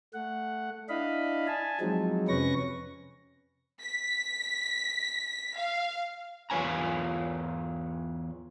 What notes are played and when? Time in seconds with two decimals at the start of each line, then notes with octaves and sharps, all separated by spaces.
0.14 A3 F#5
0.89 D4 E4 D#5 F5 B5
1.47 G#5 A5
1.80 F3 F#3 G#3 C4 D#4
2.28 F2 C3 C#4 B4 C#6 A#6
3.82 B6
5.58 F5
6.50 E2 F4 B4 C#5 G#5 A#5